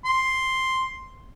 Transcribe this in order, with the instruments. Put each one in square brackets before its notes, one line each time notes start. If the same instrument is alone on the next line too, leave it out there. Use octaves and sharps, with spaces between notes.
[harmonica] C6